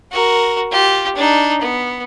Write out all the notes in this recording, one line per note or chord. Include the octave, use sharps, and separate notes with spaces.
F#4 A#4
F4 G4
D4 D#4
B3